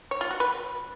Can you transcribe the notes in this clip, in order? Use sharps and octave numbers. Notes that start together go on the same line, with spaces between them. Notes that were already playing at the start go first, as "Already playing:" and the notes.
C#5
F4
F#4
B4